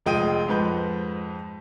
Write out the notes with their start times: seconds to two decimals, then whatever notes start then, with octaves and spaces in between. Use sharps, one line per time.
0.06 F1 A#1 G#3 G5 D#6 D#7
0.48 F2 G#2 B4 G6